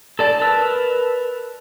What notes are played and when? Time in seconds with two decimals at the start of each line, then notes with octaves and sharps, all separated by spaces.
0.19 A4 D5 A5
0.41 A#4 B4 E6